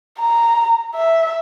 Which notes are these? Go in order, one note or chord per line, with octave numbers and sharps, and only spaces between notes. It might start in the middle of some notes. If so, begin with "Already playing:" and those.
A#5
E5